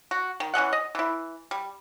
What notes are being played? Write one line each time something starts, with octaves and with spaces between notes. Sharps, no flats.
F#4
D#3
E3 C#4 D#5 F#5
D#5
E3 E4
G3